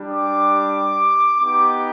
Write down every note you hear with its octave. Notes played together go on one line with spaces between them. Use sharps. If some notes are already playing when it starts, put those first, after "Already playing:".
Already playing: G3 D4 G4
D6
B3 D#4 G4 D6